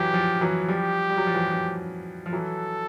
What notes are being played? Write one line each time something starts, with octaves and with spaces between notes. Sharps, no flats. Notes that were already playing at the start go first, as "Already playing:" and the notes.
Already playing: E3 F#3 G4
F3
E3 F#3
F3 G3 G4
G3
F#3
F3
E3 F#3
F3
F3
E3 F#3 A4